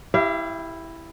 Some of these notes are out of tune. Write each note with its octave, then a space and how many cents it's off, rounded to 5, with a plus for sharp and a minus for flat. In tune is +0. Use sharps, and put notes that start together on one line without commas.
E4 +0 G4 +0 F5 -40